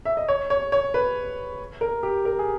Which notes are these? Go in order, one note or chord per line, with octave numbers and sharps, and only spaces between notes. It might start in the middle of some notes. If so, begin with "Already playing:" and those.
E5
D#5
C#5
C#5
C#5
B4
A#4
G4
A#4
G#4